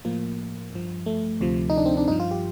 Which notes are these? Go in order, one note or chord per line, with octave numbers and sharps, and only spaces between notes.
A2 F3 A#3
G2 F3
A3
D2 C3 F3
D#4
D4
C4
D4
G2 F3 D#4
F4
G4